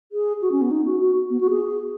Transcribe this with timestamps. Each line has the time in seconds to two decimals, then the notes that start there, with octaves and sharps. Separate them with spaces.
0.12 G#4
0.42 F#4
0.52 C#4
0.62 B3
0.71 D#4
0.86 F#4
1.01 F#4
1.30 B3
1.41 F#4
1.50 G#4